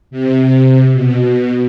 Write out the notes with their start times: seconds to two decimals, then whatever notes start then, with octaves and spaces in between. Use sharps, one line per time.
0.11 C3
0.94 B2